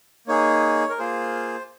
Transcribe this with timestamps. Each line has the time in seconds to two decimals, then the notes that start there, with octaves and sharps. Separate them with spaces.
0.27 A#3 D#4 G#4 C#5
0.89 A#4
0.98 A#3 F4 G#4 C5